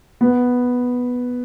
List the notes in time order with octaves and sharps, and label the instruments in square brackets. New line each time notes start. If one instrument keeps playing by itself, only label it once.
[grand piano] B3